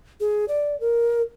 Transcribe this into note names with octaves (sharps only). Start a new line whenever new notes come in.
G#4
D5
A#4